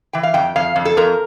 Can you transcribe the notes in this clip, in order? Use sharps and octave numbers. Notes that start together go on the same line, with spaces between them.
E3 G5
F5
F2 G5
F2 F5
F2
A4
F2 A#4